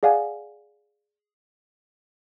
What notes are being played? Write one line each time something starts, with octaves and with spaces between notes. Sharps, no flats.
G#4 D5 F5 F#5 G#5